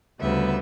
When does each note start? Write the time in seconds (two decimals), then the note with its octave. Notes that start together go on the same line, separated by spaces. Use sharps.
0.19 D2 C#3 G3 B3 E5